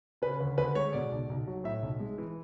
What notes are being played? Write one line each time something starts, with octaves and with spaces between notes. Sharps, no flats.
C#3 B4
D2
D2 B4
G#3 C#5
B2 D5
B1
B1
F#3
A2 E5
B1
G#3
E3